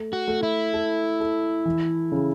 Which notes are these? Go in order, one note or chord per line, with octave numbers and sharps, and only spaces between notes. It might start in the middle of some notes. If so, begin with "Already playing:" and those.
Already playing: A3
F#4
A3
E4
A4
A4
E3
C#3